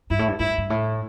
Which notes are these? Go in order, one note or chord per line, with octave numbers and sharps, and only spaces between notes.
G2 E4
A2
G2
G2 E4
G2
A2